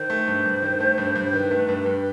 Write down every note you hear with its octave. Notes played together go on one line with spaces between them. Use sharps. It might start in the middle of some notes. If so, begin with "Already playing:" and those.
Already playing: D#3 C5
A3
G2
G2
D#3
A3
G2
G2
D#3 B4
A3
G2
G2